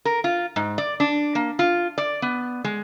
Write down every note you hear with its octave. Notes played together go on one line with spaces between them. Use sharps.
A#4
F4
G#2
D5
D4
A#3
F4
D5
B3
G#3